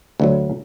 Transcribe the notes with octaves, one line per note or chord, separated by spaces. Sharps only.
D2 D3 F#3